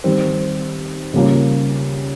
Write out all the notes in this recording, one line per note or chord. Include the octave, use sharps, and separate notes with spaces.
D#3 G3 C4
C#3 G3 A#3 C#4 F4